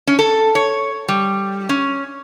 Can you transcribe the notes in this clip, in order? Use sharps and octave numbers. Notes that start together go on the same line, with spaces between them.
C#4
A4
C#5
G3
C#4